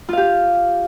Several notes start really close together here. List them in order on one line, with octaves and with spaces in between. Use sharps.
F4 F5 G4